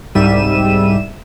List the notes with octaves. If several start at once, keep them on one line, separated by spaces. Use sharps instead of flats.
C2 G#2 G3 E5 D#7 E7